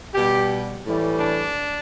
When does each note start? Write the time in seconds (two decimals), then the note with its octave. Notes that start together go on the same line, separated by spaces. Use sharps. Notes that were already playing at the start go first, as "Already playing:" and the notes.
0.14 B2 G3 G4
0.85 A2 E3 G3
1.20 D4